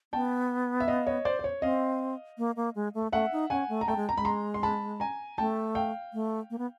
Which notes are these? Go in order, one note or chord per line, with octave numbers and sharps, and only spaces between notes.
B3 G5 A5
E5
D#5 F5
C#5 D#5
C5 D5
C5
C#5
C4 D#5 F5
A#3
A#3
G#3
A3
A3 E5 F#5
D#4
C#4 F#5 G#5
A3
A#5
A3 G5 A5
G#3
A#5
G#3 B5
A#5 C6
C6
A5 B5
G#5 A#5
A3 G5 A5
F5 G5
A3
A#3
B3